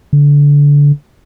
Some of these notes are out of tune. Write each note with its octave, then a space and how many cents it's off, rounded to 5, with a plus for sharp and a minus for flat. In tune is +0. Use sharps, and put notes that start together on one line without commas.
D3 -25